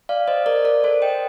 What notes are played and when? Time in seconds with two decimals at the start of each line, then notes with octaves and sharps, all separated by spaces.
0.09 D5 F5
0.28 C5 D#5
0.46 A#4 D5
0.65 A#4 D5
0.84 A4 C5
1.02 D#5 G5